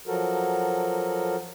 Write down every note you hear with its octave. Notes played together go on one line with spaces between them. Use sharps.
F3 F#3 F#4 A4 A#4